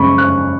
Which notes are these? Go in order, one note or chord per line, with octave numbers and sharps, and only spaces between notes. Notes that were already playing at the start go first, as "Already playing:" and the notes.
Already playing: F#2 C#3 G#3 B5 C#6
F#6